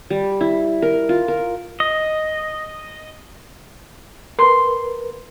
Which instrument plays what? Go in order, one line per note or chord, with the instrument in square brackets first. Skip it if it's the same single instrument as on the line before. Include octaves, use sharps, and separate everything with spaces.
[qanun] G3
E4
A#4
F4
A#4
[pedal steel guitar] D#5
[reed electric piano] A#4 B4 [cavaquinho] C6